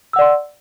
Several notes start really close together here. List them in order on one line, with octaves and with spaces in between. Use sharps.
E6 F#5 D5 C6